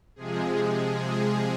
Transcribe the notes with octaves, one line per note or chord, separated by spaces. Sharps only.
C3 F3 G#3 G#4
G#4